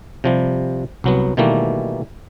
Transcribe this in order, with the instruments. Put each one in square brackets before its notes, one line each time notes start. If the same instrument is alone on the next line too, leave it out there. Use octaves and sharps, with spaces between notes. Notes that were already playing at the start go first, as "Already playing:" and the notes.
[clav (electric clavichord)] C3 F3 G3
C2 F#3 B3
B2 D#3 E3 G3 A3 A#3